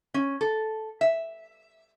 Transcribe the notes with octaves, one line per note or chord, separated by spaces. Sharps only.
C#4
A4
E5